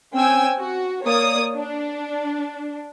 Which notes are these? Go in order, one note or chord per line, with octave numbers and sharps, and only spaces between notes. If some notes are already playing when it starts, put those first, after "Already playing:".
C4 C#4 G5 G#5 E6
F#4
A#3 C#5 D5 D#6
D4